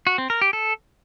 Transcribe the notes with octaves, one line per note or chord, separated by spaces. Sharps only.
F#4
C4
A#4
G4
A4